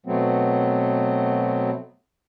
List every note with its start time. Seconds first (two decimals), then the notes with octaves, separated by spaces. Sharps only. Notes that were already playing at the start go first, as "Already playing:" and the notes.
0.06 B2 F#3 A3 B3 C4